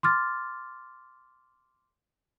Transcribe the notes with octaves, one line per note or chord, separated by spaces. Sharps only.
C6 D6 F6 A6